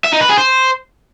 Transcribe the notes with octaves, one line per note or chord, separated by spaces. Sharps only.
E5
D#4
B4
G#4
C5